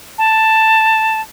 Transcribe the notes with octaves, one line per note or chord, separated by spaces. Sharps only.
A5